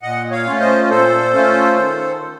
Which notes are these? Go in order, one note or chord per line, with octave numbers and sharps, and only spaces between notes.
A#2 D#5 F#5
C#5 F5
A3 C#4 F4
C5 D#5
A#2 A4 C5
A3 C#4 F4
D#3